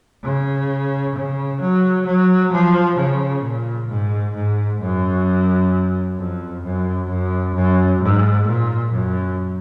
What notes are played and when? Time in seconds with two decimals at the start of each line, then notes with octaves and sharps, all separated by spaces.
0.23 C#3
1.15 C#3
1.60 F#3
2.06 F#3
2.52 F3
2.97 C#3
3.43 A#2
3.89 G#2
4.35 G#2
4.80 F#2
6.17 F2
6.63 F#2
7.09 F#2
7.54 F#2
8.00 G#2
8.47 A#2
8.91 F#2